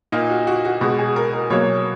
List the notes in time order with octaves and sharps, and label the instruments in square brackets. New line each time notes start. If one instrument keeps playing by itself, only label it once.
[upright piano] A#2 A#3 D#4
F#4
F#4
F#4
B2 G#3 F#4
G#4
A#4
A#4
B2 F#3 A#3 C#5